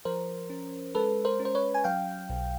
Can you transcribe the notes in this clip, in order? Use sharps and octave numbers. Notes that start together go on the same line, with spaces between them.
F3 A#4 C5
C#4
G#3 A4 B4
A#4 C5
C#4
C5
B4 C#5
G#5
F#3 F5 G5
B1